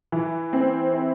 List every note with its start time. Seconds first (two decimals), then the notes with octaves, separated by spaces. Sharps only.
0.12 E3
0.53 C4
0.93 E4